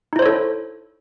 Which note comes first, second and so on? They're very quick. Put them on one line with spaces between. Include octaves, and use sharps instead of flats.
D#4 E4 C5 C#5 A4